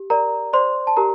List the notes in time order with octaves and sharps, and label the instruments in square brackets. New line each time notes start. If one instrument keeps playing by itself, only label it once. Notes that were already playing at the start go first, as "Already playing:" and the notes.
Already playing: [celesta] G4
A#4 D5 A#5
C5 D5 C6
A5
G4 A#4 A#5